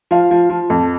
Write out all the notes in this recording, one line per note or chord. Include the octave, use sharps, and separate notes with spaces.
F3 F5
F3
F3
F2